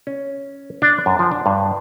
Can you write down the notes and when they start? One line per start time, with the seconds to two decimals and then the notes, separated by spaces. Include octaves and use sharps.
0.07 C#4
0.82 D4
1.06 F#2
1.19 F3
1.31 D4
1.46 G2